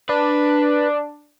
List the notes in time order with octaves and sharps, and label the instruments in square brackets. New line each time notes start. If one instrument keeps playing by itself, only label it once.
[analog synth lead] D4 [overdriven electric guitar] B4